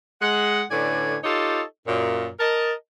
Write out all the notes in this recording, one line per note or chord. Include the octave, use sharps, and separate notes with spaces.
G#3 F#5
A2 D3 C#4 B4 D5 G#5
D#4 F4 G4 A4 C#5 D#5
F#2 A#2
A#4 D#5 A5